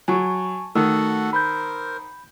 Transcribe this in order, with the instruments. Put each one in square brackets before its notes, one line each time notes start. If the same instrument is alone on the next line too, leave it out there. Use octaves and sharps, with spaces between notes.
[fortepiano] F#3 [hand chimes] G#5 A5 C#6
[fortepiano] D#3 [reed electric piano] A3 [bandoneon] F#4 A4 F#5 [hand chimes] E6
[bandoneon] A#4 C5 [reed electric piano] B5 G6